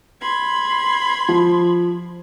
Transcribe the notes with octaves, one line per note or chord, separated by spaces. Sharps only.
B5 C6 G#6
F3